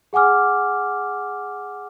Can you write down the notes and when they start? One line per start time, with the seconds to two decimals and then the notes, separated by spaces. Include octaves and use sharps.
0.13 G#4 F#5 G#5 D6 F6